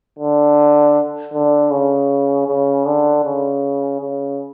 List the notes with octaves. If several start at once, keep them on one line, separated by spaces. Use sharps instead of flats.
D3
D3
C#3
C#3
D3
C#3
C#3